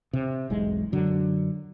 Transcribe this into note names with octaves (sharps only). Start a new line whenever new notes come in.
C3
E1 B1 G#2 G#3
F#2 D3 F#3